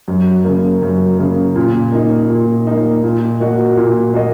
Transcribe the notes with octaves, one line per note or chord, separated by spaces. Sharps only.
F#2
C#3 A#3
F#2
C#3 A#3
A#2
A#3 D#4
A#2
A#3 D#4
A#2
A#3 F#4 D#5
A#2
A#3 F#4 D#5